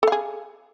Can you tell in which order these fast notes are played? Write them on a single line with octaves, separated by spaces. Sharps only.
A4 F5 G#4